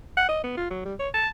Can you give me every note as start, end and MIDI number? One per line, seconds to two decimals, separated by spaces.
0.17 0.24 78
0.29 0.42 75
0.44 0.53 59
0.57 0.68 65
0.70 0.83 54
0.85 0.94 55
1.00 1.09 73
1.14 1.28 81